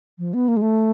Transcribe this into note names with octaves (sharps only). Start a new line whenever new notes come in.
F3
B3
A#3
G#3
A3